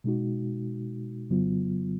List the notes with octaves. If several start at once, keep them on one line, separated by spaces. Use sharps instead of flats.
B2 G#3 D#4 F#4
F2 C#3 F#3 B3 F4